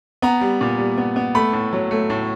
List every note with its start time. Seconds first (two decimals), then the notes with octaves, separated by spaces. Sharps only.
0.22 B3 A#5
0.41 G3
0.61 A#2
0.78 G3
0.98 B3
1.16 B3
1.35 A3 B5
1.53 A2
1.73 F#3
1.91 A3
2.10 A2